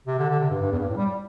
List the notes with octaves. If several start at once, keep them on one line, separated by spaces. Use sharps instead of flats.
C3
D3
D3
C3
G2
G2
E2
G2
A2
G3